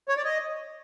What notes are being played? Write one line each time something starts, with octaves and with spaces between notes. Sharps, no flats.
C#5
D5
D#5